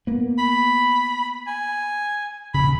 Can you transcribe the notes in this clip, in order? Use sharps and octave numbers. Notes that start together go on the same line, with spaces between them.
A#3 B3
B5
G#5
D#1 C#3 B5